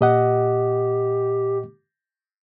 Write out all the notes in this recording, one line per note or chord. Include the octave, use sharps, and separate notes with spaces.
A#2 G4 D#5 F#5